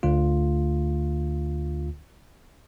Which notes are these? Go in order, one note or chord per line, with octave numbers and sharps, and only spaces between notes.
D2 D3 A3 F4